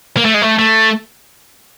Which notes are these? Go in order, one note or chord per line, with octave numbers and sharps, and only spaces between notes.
A#3
A3
G#3
A3
A3